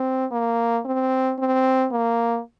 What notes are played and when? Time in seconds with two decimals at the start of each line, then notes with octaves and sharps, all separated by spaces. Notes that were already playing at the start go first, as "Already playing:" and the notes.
Already playing: C4
0.32 A#3
0.85 C4
1.39 C4
1.92 A#3